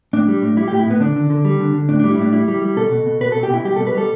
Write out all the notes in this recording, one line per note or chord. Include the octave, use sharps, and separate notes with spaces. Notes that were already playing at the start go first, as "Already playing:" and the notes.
A2 D4
G3
A2
G3 E4
A2 G4
E4
A2 B3
D3 D4
D3
D3
G3
D3
D3
A2 D4
G3 D4
E4
A2 D4
G3 E4
G3
G3
B2 A4
B2
B2
B2 B4
B2 A4
G4
B2 E4
G3 G4
B2 A4
B4
G3 A4